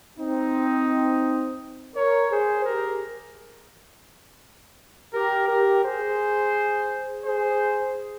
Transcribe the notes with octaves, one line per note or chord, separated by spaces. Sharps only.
C4 D#4
A#4 C#5
G#4 C5
G4 A#4
G4 A#4
G4 A#4
G#4 C5
G#4 C5